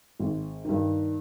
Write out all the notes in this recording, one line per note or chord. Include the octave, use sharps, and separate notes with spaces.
G#1
G2 D#3